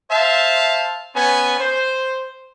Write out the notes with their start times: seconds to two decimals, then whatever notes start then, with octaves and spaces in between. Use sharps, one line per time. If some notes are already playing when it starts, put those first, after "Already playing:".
0.10 C5 E5 F5 A5
1.15 B3 C#4 G#5
1.59 C5